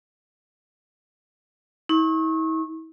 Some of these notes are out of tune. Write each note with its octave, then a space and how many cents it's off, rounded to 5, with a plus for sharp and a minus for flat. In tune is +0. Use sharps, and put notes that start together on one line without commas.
E4 -45 C#6 -30